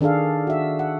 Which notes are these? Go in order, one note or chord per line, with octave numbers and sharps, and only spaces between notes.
D#3 D4 G#4 A4 F5
F#4 E5
F#5